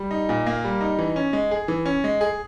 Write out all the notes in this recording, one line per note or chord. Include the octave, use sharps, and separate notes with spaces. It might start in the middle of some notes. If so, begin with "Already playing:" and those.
Already playing: G3
D#4
A#2
A#3
G3
D#4
E3
C#4
G#3
G#4
E3
C#4
G#3
G#4